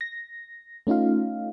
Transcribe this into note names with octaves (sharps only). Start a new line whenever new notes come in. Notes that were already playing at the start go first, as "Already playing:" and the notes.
A#6
A3 C#4 D#4 F4 F5